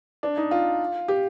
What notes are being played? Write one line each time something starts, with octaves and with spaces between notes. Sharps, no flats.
D4
D#4
F4
G4